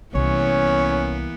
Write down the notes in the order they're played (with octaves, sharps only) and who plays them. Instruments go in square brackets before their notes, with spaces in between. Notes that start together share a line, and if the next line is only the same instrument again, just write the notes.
[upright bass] C2 [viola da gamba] E3 A#3 B3 [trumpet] C#4 [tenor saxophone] C#5